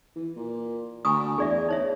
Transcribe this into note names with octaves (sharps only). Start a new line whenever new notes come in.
E3
A#2
D2 G#5 C#6 D#6
E2 G#4 D5 E5
D#4 C#5 E5